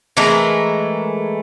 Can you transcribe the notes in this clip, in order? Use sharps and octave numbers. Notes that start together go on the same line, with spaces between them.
E3 G#3 A3 A#4